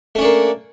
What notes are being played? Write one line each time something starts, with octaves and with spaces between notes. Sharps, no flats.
A3 A#3 C#4 D4